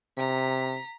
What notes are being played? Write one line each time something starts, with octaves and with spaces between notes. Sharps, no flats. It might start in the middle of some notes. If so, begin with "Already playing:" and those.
C3 A#5 B6